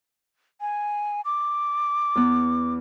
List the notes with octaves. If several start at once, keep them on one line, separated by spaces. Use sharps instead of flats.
G#5
D6
E2 B3